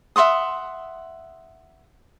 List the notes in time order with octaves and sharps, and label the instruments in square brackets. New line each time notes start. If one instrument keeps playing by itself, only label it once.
[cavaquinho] E5 F#5 C6 D#6